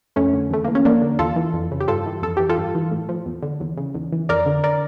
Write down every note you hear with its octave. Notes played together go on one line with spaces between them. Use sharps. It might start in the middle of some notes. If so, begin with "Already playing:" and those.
F2 A3 C#4
D3
E2 A3
E3 A#3
C#4
F2 A#3 D4
D3
E2 F4 A4
E3
F2
C#3
G4
G2 F4 A4
E3
F2 A4
E3 G4
F4 A4
G2
E3
A2
F3
E2
D3
E2
C#3
E2
E3
F2 A#4 D5
D3
A#4 D5